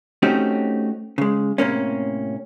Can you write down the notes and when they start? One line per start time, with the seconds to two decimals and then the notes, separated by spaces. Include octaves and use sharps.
0.22 A3 C4 C#4 D#4 F#4 G4
1.18 C#3 G#3
1.58 A2 C3 A#3 C#4